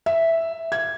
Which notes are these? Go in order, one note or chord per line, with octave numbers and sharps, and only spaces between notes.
E5
G#6